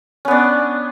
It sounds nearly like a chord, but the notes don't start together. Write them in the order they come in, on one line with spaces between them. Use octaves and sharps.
C#4 B3 D4